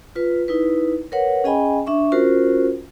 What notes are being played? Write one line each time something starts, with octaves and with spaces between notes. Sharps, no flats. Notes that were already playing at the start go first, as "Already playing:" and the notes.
F4 B4
D#4 E4 B4
A#4 B4 C#5 F#5
C#4 G#4 D#5 G5 G#5 B5
D4 E5 C#6
C#4 F4 F#4 A#4 C5